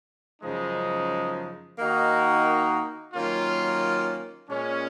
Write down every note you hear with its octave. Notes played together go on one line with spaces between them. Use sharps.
F#2 C#3 F3 G#3 D#4
D#3 A#3 D#4 F#4
D#3 F#3 A#3 C#4 F4
A#2 G#3 C#4